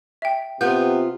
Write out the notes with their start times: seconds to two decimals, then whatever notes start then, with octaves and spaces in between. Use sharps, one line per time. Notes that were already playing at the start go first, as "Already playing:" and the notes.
0.22 E5 G5
0.61 C3 B3 F4 G6